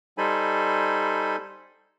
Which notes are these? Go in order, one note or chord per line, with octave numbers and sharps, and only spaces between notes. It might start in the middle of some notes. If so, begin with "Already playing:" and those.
G3 D#4 A4 C5 G#5 B5